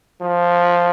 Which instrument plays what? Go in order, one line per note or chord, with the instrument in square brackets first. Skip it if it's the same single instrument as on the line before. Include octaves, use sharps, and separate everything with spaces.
[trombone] F3